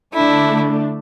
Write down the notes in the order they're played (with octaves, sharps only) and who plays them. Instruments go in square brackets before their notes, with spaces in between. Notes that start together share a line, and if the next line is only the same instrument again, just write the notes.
[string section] D3 A3 D4 [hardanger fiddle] E4